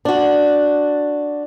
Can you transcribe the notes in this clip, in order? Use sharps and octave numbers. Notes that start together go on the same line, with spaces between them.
D4 F#4